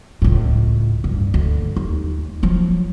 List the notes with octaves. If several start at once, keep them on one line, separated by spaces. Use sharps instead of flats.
C#2 A2
G2
D2
D#2
F3 F#3